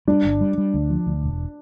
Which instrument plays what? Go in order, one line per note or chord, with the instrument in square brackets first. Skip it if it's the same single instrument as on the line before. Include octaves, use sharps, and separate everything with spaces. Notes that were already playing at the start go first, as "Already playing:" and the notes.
[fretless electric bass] G3 [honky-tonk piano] D4
[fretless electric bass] G1
G3
G3
D2
F3
D2
E1